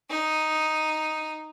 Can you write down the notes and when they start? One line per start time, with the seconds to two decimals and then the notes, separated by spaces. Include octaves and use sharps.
0.10 D#4